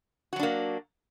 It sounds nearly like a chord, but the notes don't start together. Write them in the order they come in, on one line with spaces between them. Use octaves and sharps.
F#4 F#3 D4 A#3